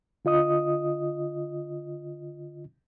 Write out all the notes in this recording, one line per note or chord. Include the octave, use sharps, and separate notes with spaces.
D3 F4 D#5 D#6